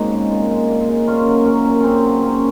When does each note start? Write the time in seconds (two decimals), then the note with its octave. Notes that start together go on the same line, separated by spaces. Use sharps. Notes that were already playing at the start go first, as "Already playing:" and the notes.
Already playing: G#2 C#3 A#3 C4 D#4 F#4
0.11 G#3
0.31 A#2
0.50 G#3
0.70 A#2
0.88 G#3
1.07 A#2 C#4 F4
1.27 F#3
1.45 A#3 C#4
1.66 A#2
1.80 C#3 C4 C#4
2.03 F#3
2.23 A#3 C#4